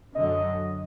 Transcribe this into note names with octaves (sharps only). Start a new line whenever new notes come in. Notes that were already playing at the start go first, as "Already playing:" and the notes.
F#2 D3 F#3 D#5